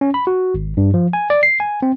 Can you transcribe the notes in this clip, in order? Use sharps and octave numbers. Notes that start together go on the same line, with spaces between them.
C#4
B5
F#4
G#1
G2
F3
G#5
D5
C7
G#5
C4